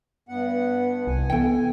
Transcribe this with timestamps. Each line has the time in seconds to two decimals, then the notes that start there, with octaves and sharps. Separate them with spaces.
0.29 G2 B3 F#5
1.07 C2 G#5
1.30 E3 B3 A4 G5